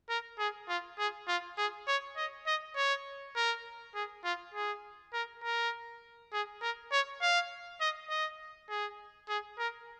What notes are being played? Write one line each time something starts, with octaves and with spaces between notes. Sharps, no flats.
A#4
G#4
F4
G#4
F4
G#4
C#5
D#5
D#5
C#5
A#4
G#4
F4
G#4
A#4
A#4
G#4
A#4
C#5
F5
D#5
D#5
G#4
G#4
A#4